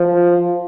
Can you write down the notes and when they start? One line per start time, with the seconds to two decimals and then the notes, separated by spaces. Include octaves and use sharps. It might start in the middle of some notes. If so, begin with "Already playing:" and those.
Already playing: F3